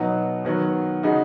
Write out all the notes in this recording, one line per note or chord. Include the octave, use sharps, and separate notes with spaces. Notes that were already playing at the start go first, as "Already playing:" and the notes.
Already playing: B2 F#3 B3 D#4 F#4
D#3 F#3 B3 F#4
C#3 G#3 D#4 F#4